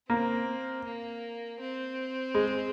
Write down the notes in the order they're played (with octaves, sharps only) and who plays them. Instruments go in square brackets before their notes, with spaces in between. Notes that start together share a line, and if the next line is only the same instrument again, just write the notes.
[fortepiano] A#3 [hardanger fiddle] C4
[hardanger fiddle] A#3
C4
[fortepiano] G#3